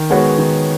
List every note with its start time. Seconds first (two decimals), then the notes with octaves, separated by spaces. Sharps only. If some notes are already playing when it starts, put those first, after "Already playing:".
Already playing: D#3
0.10 G#3 B3 F#4 C#5
0.38 D#3